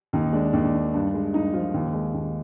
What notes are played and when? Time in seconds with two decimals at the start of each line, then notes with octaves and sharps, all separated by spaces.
0.13 D#2 D#4
0.33 G#3 D4
0.53 D#2 D4
0.74 D#3
0.94 G2
1.14 G#3
1.34 G2 D#4
1.53 F3 F4
1.74 D#2
1.93 G#3
2.14 D#2